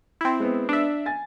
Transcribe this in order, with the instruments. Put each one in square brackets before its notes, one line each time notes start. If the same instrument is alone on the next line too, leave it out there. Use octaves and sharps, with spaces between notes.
[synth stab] C4 E4
[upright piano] G#3 B3 C5
[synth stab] D4 E5
[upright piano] G#5 A6